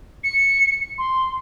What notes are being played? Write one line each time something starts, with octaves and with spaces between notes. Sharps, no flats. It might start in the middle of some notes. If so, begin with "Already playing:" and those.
C#7
C6